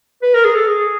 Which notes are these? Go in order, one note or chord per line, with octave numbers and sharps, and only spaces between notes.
B4
A#4
G#4
A4
G#4